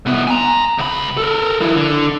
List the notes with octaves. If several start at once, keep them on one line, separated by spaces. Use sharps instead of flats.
C2 B3
G#5 A#5
C#2 B5
A4 A#4
F3 E4
D3